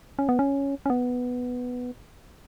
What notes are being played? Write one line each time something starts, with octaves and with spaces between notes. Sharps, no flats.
C#4
B3
C#4
C#4
B3